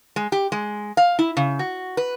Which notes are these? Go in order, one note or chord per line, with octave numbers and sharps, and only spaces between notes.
G#3
G4
G#3
F5
E4
C#3
F#4
B4